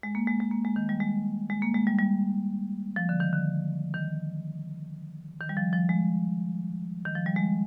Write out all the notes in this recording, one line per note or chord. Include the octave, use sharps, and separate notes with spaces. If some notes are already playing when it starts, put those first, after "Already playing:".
G#3
A#3
G#3
G#3
A#3
G#3
D#3
G3
G#3
G#3
A#3
G#3
G3
G3
F3
D3
D#3
D3
D#3
D#3
G3
F3
F3
G#3
D#3
F3
G3
G#3